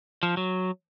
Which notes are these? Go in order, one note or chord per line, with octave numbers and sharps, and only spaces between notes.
F3
F#3